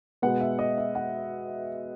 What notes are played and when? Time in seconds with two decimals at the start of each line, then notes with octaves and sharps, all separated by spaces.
0.22 B2 G#3 B3 F#5
0.41 E5
0.59 D#5
0.78 E5
0.95 F#5